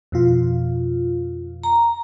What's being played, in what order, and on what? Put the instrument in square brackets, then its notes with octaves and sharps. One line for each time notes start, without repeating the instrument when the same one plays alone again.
[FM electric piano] F2 B2 F4
[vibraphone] A#5